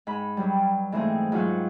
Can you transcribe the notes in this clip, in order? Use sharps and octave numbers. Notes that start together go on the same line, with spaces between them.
G#2 B5
G2 F#3 G3
G#2 E3 A3 A#3 C4 G#4
G#2 F#3 F4 F#4 G6